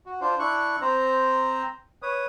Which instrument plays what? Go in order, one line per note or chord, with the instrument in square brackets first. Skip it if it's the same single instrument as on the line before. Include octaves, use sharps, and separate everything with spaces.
[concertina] F#4
D4 F4 C5
D4 E4 C#6 F#6
C4 C5 A#5
B4 C#5 D#6